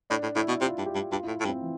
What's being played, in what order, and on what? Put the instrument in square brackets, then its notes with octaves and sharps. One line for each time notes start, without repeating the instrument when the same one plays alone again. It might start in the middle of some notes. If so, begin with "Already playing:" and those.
[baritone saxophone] A2 [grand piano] D4
[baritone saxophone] A2
[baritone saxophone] A2 [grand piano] E4
[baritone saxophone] B2
[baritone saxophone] C3 [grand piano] F4
[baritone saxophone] G2
[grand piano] G4
[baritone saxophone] G2
[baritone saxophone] G2 [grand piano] F4
[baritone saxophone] A2 [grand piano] E4
[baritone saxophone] A2
G2
[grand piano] C4
E3